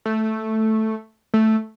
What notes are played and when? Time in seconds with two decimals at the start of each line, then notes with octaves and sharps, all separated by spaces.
0.05 A3
1.34 A3